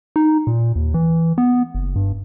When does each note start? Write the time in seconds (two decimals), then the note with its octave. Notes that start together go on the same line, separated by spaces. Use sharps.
0.16 D#4
0.47 A#2
0.76 D#2
0.94 E3
1.38 B3
1.75 F#1
1.96 G2